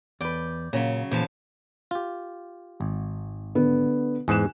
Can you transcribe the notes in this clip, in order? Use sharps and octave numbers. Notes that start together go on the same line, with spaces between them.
E2 B4 D5 G5
A#2 C#3 F#3 C#4
E2 A#2 F3 A5
F4 G4
G#1
D3 B3
E2 G#2 G#5 F#6 E7